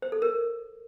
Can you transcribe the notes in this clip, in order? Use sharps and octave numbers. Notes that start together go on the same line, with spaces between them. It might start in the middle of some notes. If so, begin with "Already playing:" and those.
C5
A4
A#4